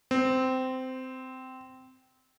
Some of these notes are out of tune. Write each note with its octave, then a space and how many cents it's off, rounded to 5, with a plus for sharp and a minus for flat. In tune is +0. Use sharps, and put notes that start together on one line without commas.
C4 -15